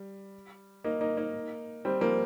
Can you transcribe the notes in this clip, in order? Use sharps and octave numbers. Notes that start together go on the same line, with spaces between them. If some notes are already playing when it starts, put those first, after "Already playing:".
Already playing: G3
A#3 D#4
A#3 D#4
A#3 D#4
G3 C4
F3 A#3